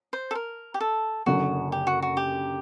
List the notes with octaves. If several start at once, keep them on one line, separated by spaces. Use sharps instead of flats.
C5
A4
A#4
G4
A4
F#1 F#2 D3 F#4
G4
F#4
F#4
G4